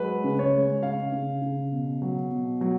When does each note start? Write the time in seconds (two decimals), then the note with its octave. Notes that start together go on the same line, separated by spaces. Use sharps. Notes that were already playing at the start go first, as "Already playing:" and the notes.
Already playing: F#3 G#3 B4
0.24 C#3
0.39 C#5
0.53 G#3
0.83 C#3 F5
1.12 C#3
1.42 C#3
1.72 B2
2.02 F#3
2.31 B2
2.61 F#3